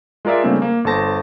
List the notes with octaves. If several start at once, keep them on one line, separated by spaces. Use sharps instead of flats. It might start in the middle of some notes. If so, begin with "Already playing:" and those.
G#3 F4 A#4 D5 E5
C#3 G3 A3 A#3 C4 D4
A#3
G1 A4 C5 A5 A#6